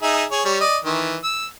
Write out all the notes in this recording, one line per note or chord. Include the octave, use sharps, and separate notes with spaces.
D#4 G#4 E5
G#4 C#5
G3 C#5
D5 D#5
D#3 E3
E6